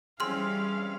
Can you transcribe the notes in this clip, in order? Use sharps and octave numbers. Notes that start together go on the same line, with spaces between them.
E3 G3 C4 C#4 G#4 F5 C6 F6